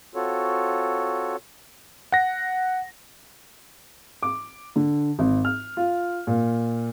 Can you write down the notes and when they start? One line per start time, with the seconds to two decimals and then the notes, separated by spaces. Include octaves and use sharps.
0.15 C4 F4 F#4 A4 C#5
2.12 F#5 A#6
4.23 D6
4.76 D3
5.19 G#1
5.45 F6
5.77 F4
6.27 A#2